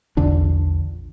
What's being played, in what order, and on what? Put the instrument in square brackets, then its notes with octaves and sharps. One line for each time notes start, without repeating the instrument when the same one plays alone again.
[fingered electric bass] A#1 E2 D3 D4